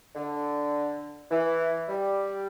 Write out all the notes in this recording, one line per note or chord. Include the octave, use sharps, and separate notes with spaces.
D3
E3
G3